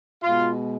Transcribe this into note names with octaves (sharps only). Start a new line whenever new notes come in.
B2 G#3 F4